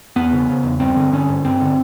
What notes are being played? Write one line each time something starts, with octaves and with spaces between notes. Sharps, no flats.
E2 B3
C#3
C#3
E2
G2 C4
D3
D3 C#4
G2
G2 C4
D3